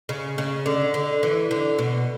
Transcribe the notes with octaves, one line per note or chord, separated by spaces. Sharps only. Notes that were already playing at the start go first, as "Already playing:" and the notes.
C#3
C#3
D3
D3
E3
D3
B2